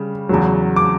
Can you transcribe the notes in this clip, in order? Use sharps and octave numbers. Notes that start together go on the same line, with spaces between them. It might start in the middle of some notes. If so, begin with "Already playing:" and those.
Already playing: C#3 G3
E2 C#3 F#3
D6